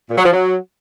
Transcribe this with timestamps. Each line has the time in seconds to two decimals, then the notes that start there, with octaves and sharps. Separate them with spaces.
0.09 A#2
0.17 F#3
0.24 F3
0.32 F#3